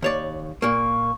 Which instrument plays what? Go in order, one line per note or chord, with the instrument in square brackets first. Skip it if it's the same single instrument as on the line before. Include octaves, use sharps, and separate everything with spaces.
[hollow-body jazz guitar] D#2 C#5 D5
[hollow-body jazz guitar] A#2 A#3 [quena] C#6